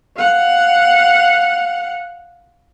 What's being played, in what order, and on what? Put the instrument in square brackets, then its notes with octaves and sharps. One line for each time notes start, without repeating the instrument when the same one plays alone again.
[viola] F5 F#5